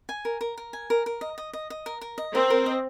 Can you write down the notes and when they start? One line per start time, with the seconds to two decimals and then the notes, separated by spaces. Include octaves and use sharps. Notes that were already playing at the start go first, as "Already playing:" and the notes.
0.09 G#5
0.25 A#4
0.41 A#4
0.58 A#4
0.73 G#5
0.90 A#4
1.06 A#4
1.21 D#5
1.38 D#5
1.53 D#5
1.70 D#5
1.86 A#4
2.01 A#4
2.18 D#5
2.34 C4 A#4
2.50 A#4
2.66 D#5